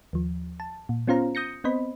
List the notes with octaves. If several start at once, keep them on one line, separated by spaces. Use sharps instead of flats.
D#2 F3
A5
A#2
B3 C#4 F4 C5 F5 A#5
D#6 G6 A#6 C#7
B3 C4 C5 D#5 B5